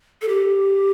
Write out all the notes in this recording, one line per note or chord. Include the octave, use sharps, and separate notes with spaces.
A4
G4